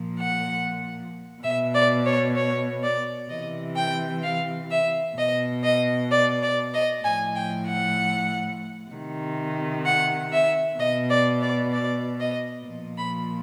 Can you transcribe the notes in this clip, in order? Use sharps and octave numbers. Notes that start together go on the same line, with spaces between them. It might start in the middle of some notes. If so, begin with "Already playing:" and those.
Already playing: A#2 F3
F#5
B2 E5
D5
C#5
C#5
D5
C3 E3 D#5
G5
F5
E5
B2 D#5
D#5
D5
D5
D#5
A2 F3 G#5
G5
F#5
C3 D#3
F#5
E5
B2 D#5
D5
D5
D5
D#5
A#2 F3
B5